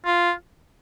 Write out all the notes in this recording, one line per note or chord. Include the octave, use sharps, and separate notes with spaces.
F4